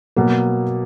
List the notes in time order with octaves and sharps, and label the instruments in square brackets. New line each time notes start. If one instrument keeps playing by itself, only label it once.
[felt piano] B2 F#3 A#3